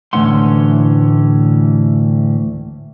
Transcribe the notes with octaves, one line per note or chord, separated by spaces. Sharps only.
D2 A2 E3 C#4 F#5 C6